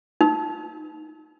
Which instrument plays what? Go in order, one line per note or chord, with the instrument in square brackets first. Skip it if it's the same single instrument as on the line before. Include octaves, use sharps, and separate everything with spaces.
[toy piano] D#4